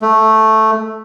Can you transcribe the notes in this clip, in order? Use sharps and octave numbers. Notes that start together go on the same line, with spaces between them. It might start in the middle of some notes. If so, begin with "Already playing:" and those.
A3